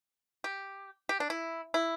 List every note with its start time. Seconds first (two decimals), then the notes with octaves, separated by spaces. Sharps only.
0.44 G4
1.09 G4
1.20 D4
1.30 E4
1.74 E4